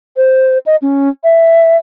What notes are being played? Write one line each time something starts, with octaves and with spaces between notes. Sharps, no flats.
C5
D#5
C#4
E5